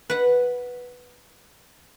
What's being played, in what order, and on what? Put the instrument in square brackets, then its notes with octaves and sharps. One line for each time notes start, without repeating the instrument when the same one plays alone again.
[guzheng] B4 F#5